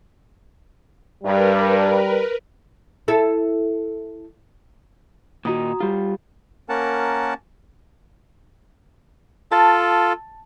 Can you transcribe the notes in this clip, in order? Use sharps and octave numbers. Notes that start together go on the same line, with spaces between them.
G2 G3 A#4 B4
E4 A4
A#2 D#3 D#4 F#4 A#5 D#6
G3 F4 G4
A#3 C#4 A#4 F#5 A5
F4 A4 A5